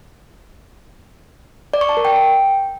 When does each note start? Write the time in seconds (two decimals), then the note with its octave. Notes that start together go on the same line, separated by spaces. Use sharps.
1.74 D5
1.81 C#6
1.89 A5
1.97 A#4
2.05 G5